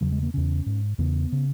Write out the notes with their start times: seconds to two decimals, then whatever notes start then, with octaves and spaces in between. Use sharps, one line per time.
0.01 E2 C#3 F#3
0.12 G#3
0.23 A#3
0.34 E2 C#3 C#4
0.66 G#2
0.98 E2 C#3 B3
1.32 C#3